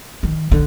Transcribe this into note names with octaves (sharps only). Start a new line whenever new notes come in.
D#3
D3